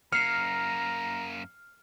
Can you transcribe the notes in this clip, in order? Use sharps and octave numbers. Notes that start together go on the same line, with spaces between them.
F#2 A#3 A#5 F6 C7 C#7